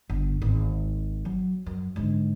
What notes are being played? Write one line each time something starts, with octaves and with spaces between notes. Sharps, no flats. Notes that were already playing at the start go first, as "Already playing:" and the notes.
G1
G#1
F#3
F#2
G#2 D3